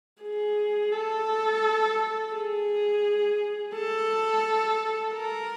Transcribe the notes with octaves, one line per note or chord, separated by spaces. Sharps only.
G#4
A4
G#4
A4
A#4